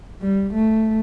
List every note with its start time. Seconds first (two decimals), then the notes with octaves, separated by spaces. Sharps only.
0.21 G3
0.54 A3